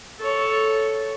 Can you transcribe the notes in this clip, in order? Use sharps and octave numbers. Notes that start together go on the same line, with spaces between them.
A4 C#5